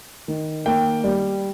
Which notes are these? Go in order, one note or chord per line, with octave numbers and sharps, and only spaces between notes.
D#3
A#3 G5
G3